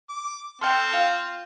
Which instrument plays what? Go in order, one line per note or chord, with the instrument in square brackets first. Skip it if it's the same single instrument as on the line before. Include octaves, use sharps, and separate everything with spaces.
[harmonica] D6
[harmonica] C4 [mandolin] A4 G5 [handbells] C6 F6 G6
[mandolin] F4 F5